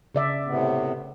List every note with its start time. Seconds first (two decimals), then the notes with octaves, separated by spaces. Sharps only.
0.15 C#3 D5 E5
0.45 A2 C3 B3